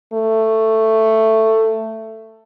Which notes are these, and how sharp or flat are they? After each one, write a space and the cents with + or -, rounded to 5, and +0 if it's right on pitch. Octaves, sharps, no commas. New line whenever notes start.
A3 +10